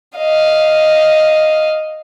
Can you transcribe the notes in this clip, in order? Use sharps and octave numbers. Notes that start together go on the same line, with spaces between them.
D#5 F5